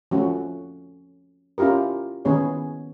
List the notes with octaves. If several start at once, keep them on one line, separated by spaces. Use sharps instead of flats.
F3 A3 C#4 F#4
C#4 E4 F4 G4 A#4
D#3 B3 C#4 E4 G#4 C#5